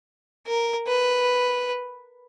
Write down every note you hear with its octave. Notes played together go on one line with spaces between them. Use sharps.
A#4
B4